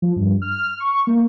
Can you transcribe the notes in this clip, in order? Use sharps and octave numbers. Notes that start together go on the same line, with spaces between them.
F3
G2
F6
C#6
A#3